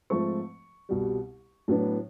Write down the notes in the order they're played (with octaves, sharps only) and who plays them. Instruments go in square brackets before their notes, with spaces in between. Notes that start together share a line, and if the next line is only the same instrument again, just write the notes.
[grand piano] G#2 F3 A3 C4 C#6
C2 B2 G3
A2 F#3 B3 D4